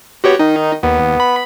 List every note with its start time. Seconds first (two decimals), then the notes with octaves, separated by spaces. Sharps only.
0.24 B3 F#4 G4 C#5
0.39 D#3 D#4
0.83 D#2 B3
1.20 B5